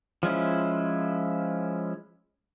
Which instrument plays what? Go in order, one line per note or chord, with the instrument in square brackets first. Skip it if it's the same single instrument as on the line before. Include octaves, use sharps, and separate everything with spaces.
[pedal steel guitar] F3 G#3 C#4 E4